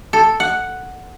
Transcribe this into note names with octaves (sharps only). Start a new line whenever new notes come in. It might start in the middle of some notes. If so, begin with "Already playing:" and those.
A4
F#5